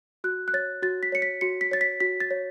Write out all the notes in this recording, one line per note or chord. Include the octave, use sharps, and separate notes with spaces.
F#4 F#6
F#6
C#5 A6
F#4 A6
B6
C#5 C#7
B6
F#4 C#7
B6
C#5 A6
B6
F#4 B6
A6
C#5